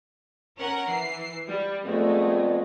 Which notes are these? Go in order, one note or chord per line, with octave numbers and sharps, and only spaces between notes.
C#4 A#4 F#5
E3 C7
G3
F2 G#3 A3 B3 D5